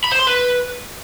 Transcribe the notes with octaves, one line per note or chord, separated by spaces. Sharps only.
B5
C5
C6
B4